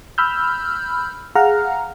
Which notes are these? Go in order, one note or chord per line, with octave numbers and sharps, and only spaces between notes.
B5 E6 F6 G6
G#4 F5 F#5 A#5 F6